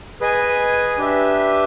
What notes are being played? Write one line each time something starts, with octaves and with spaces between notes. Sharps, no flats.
G#4 B4 D#5 G#5
D4 G4 B4 E5